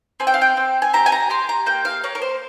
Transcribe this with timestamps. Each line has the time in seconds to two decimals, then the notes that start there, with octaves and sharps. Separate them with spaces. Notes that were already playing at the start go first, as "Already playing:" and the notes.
0.20 C4 G#5
0.27 G5
0.34 F5
0.41 G5
0.57 C4
0.82 G#5
0.93 G4 A#5
1.06 G#5
1.12 A#5
1.30 G4 C6
1.49 A#5
1.66 A#3 G5
1.85 F5
2.04 A#3 C#5
2.15 A#4
2.22 C5